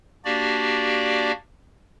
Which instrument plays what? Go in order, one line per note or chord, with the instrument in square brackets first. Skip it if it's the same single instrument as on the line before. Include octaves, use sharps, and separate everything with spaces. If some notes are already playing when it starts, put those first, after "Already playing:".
[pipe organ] A#3 D4 F#4 G4 D5